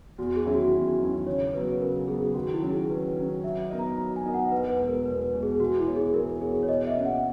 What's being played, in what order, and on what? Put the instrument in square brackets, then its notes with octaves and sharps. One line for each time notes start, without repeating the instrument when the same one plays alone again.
[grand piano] E2 [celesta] F#4
[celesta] G#4
[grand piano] D#3 F#3 C#4 E4
[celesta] F#4
[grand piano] E2
D#3 F#3 C#4 E4
[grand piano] C#3 [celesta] C#5
[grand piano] F#3 B3 F#4 [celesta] B4
[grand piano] C#3 [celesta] A#4
[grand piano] F#3 B3 F#4 [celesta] G#4
[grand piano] D#3 [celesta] F#4
[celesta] E4
[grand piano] F#3 C#4
[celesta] G#4
[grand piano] D#3 [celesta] B4
[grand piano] F#3 C#4
[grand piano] F#3 [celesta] E5
[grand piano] B3 D#4 A#4 D#5
[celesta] A#5
[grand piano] F#3 [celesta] A#5
[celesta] G#5
[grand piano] B3 D#4 A#4 D#5
[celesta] F#5
[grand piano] E2 [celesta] B4
[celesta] B4
[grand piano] B2 G#3
[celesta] A#4
[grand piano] E2 [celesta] B4
[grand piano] B2 G#3
[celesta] G#4
[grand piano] E3 [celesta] F#4
[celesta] E4
[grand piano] B3 F#4 C#5
[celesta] G#4
[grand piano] E3 [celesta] A#4
[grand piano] B3 F#4 C#5 [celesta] G#4
[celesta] C#5
[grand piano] B2 [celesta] D#5
[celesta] E5
[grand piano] A#3 C#4
[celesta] F#5